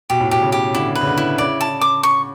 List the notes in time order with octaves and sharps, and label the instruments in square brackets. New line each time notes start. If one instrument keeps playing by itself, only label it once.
[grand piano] B2 [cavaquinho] G4
[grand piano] A2
[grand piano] B2 [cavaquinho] G4
[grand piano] C#3
[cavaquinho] G4
[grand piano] D3 [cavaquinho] E4
[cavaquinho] B4
[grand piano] C#3
D3
[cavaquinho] E4
[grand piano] C#3 [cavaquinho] D5
[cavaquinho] A5
D6
C#6